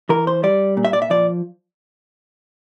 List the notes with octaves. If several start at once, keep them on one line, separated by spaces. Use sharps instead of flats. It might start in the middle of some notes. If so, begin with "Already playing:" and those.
E3 A#4
C5
G3 D5
A#2
E5
D5
E5
F3 D5